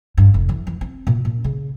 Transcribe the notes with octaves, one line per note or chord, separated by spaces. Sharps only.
G2
F1
E3
E3
C4
A#2
A#2
C#3